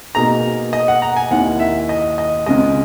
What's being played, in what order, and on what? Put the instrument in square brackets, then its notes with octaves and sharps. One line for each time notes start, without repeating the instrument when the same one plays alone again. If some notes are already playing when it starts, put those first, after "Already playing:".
[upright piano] B2 A#3 D#4 G#4 [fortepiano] A#5
[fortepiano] D#5
F#5
A#5
G#5
[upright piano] D#2 D#3 A#3 E4 [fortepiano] F#5
[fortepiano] E5
D#5
D#5
[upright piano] C#2 C#3 G#3 [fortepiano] D#5